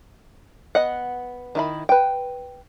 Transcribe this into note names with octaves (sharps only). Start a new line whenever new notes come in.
B3 D#5 F#5
D#3 E4 B5
B4 G5